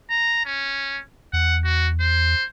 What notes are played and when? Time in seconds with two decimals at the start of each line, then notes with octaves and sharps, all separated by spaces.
0.10 A#5
0.45 C#4
1.33 E2 F#5
1.64 F#4
2.00 C5